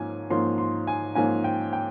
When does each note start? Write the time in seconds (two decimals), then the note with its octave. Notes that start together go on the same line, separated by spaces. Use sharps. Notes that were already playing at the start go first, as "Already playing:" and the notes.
Already playing: G#2 F3 A#3 C#4 G#5
0.30 G#2 F3 A#3 C#4 C6
0.58 C6
0.87 G#5
1.15 G#2 F3 A#3 C#4 G#5
1.44 G5
1.73 G5